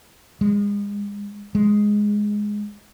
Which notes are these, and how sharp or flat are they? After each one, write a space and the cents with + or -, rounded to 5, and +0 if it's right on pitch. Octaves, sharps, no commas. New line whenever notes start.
G#3 -35
G#3 +0